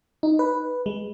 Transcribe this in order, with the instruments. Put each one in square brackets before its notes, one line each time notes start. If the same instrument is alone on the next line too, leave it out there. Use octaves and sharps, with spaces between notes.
[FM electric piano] D#4
B4
G#3